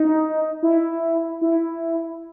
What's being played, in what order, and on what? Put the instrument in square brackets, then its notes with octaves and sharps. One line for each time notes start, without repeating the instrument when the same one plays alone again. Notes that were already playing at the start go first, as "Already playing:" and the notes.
Already playing: [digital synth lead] D#4
E4
E4